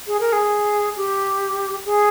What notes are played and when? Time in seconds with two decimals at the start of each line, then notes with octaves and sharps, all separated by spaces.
0.07 G#4
0.20 A#4
0.32 G#4
0.96 G4
1.85 G#4